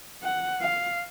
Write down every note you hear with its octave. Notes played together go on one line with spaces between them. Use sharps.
F#5
F5